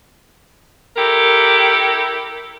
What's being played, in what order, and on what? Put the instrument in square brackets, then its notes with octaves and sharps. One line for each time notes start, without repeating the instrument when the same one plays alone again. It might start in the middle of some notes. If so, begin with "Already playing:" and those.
[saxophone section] E4 G4 A4 A#4